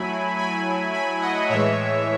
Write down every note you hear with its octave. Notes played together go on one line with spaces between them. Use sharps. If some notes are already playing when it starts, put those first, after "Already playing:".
Already playing: F#3 A3 E4 G#5 B5
G#5 B5
G#5 B5
D#5 F#5
A2 E3 G#3 C#5 E5